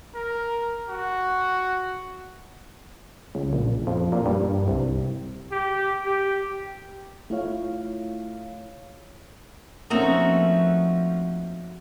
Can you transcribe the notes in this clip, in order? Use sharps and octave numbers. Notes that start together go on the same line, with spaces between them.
A#4
F#4
C#2
A#1
F2
A#2
G2
C2
G4
G4
A3 E4 F4 C#5 F5
F3 A3 A#3 C4 C#4 D#4 F#4 E5